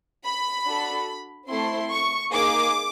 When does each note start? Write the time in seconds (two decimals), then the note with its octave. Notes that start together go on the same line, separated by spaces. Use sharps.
0.25 B5
0.65 D4 F#4 A4
1.49 A3 C4 E4 A4 C6
1.91 C#6
2.32 A#3 D#4 G#4 D6